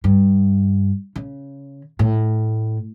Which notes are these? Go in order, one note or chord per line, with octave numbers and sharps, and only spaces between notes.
G2
C#3
A2